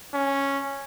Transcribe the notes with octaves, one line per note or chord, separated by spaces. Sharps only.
C#4